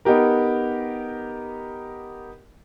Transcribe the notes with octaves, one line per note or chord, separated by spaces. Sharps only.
B3 D#4 G4 A#4